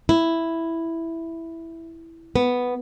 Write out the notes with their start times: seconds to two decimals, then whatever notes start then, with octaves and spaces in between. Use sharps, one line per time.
0.09 E4
2.36 B3